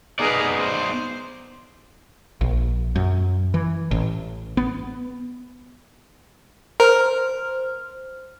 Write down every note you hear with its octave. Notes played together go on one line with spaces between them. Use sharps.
B3 D#4 G#4 A#4 B4 D5
C5
A#1
F#2
E3
A1
B3
A#4 C5 F6